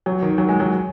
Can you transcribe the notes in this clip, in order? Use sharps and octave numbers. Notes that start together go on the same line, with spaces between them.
F#3
D#3
F#3
G#3
F#3